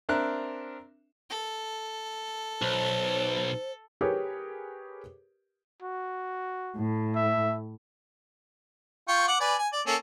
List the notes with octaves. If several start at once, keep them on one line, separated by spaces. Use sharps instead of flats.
C4 D4 A#4 E5 F#6
A4
B1 C5
G4 G#4 A#4 B4 C#5
F#4
A2
E5
F4 G5 C#6
F#5 D6
B4 D5 G#5
G#5
D5
A#3 C#4 A4